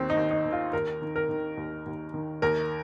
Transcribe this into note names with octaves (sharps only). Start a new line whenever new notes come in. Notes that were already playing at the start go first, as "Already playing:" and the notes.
Already playing: D#2 D#3 C4
D#4
D#2
D#4
D#3
F4
D#2 A#4
D#3
A#4
D#3
D#2
D#2
D#3
D#2 A#4